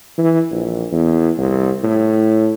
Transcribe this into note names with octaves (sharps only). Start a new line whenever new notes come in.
E3
A#1
E2
C2
A2